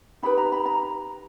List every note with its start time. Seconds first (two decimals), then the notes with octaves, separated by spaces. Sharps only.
0.23 D#4 G4 B4 B5
0.37 A#5
0.52 B5
0.66 A#5